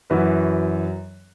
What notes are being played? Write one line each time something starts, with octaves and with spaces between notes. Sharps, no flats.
F#2 E3 F#4 B4